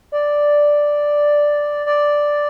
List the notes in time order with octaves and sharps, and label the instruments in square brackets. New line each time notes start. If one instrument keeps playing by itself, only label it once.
[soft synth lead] D5
D5